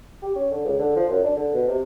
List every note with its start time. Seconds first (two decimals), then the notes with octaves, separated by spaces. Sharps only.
0.22 G4
0.36 C#4
0.51 D3
0.65 C#2
0.79 D3
0.96 F3
1.10 F#2
1.24 D4
1.36 D3
1.53 B2
1.67 C3